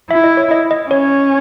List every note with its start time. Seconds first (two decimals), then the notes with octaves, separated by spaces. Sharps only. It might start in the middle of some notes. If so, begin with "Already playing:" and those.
0.11 E4 E5
0.24 D#5
0.37 C#5
0.51 D#5
0.71 D#5
0.90 C#4 C#5